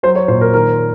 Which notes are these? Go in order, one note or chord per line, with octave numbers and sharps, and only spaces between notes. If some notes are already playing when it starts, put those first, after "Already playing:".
F#3 C5
C#5
A#2 C5
A#4
D#3 A#4